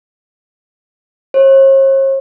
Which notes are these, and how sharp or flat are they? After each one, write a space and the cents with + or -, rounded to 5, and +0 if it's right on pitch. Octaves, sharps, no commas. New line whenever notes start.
C#5 -45